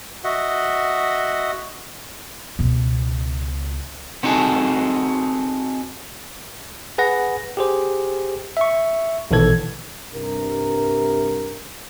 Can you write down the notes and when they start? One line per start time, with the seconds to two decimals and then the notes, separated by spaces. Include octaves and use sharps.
0.24 F#4 D#5 E5 F#5
2.59 C#2 B2
4.23 B3 C4 D#4 F#4 G#4 A4
6.98 G#4 B4 F#5 A#6
7.57 G4 G#4 C5
8.57 E5 C#6
9.31 A#1 B2 D#3 E3 A4 G#6
10.13 C2 G2 A#4